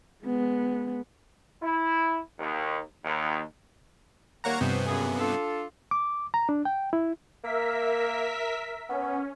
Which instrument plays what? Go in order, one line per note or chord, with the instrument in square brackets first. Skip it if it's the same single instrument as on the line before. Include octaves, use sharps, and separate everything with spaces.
[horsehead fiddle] G#3 B3
[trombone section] E4
D#2
D#2
[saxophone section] D#3 G3 A#3 [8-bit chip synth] C#5 F#5 A#5
[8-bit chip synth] G2 C3 B3 [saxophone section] F3 C#4 C5
[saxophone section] F#2 C#3 G#4
D4 F4 A4
[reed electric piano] D6
A#5
D4
G5
E4
[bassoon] A#3 [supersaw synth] A#4 E5 B6
[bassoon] B3 [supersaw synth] C#4